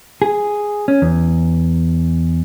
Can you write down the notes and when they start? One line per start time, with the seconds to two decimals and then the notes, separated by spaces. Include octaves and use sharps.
0.22 G#4
0.88 C#4
1.02 E2